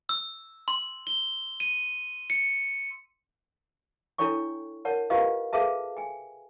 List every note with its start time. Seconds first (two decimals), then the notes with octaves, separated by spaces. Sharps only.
0.09 E6
0.68 C6
1.07 G7
1.60 D#7
2.30 C#7
4.18 D4 E4 A4 C#5 G5 C#6
4.85 A#4 C#5 F#5 A5
5.10 F4 G4 A#4 B4 D#5 F5
5.53 G#4 A4 B4 E5 F5 A5
5.97 G5 G#5